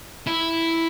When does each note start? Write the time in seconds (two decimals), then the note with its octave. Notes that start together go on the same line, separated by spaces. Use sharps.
0.27 E4